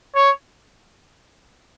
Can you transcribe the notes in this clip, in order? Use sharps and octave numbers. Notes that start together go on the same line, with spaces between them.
C#5